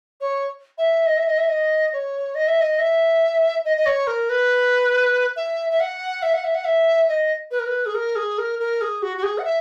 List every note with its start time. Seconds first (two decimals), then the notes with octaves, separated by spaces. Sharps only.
0.21 C#5
0.78 E5
1.06 D#5
1.17 E5
1.27 D#5
1.38 E5
1.48 D#5
1.93 C#5
2.35 D#5
2.47 E5
2.60 D#5
2.79 E5
3.65 D#5
3.77 D#5
3.86 C#5
4.07 A#4
4.29 B4
5.36 E5
5.70 E5
5.80 F#5
6.22 E5
6.34 F#5
6.44 E5
6.55 F#5
6.65 E5
7.09 D#5
7.51 B4
7.59 A#4
7.66 B4
7.86 G#4
7.94 A#4
8.16 G#4
8.38 A#4
8.59 A#4
8.81 G#4
9.02 F#4
9.17 F#4
9.23 G#4
9.38 F#5
9.45 E5